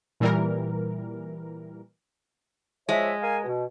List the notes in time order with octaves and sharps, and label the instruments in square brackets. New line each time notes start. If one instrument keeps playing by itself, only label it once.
[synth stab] A#2 E3 G3 A#4
[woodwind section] F3 C#5 E5 [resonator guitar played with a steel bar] G#3
[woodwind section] A#4 F5 G#5
B2